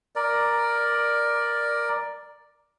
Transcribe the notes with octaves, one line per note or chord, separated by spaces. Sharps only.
A#4 D5